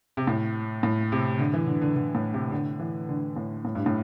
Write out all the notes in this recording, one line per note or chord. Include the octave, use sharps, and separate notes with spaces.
C3
A2
A2
C3
D3
E3
D3
D3
D3
A2
C3
D3
E3
D3
A2
A2
G2
A2